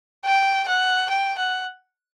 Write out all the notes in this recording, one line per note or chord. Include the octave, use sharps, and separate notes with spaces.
G5
F#5
G5
F#5